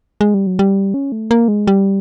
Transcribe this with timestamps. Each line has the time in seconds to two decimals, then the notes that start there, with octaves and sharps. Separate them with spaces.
0.21 G#3
0.34 G3
0.47 F#3
0.59 G3
0.94 C#4
1.12 A3
1.31 A#3
1.48 G#3
1.67 G3